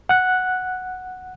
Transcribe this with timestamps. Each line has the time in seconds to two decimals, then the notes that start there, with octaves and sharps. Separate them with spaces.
0.09 F#5 F#6